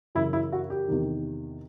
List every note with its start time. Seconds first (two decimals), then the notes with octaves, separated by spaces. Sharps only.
0.15 F#2 C#3 E3 E4
0.33 E4
0.52 F#4
0.70 G4
0.88 E2 C3 D#3